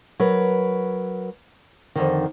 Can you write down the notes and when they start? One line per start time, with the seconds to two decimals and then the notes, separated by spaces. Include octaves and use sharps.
0.19 F#3 A#4 B4
1.95 F2 D3 D#3